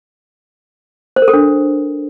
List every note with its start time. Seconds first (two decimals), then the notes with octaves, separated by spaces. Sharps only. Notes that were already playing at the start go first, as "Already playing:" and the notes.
1.16 C5
1.22 A#4
1.28 A4
1.33 D4